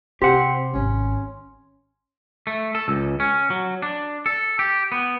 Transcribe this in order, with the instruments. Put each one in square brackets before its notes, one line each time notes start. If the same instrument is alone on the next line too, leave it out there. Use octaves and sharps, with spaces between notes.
[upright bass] C3 [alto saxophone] C4 [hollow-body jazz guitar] G4 F#5 [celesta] C6
[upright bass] G#1 D#3 [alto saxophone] C#4
[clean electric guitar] A3
A4
C#2
C#4
F#3
D4
A4
G4
B3